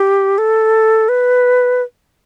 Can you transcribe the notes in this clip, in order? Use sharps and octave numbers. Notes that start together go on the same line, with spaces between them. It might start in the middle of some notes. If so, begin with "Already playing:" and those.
Already playing: G4
A4
B4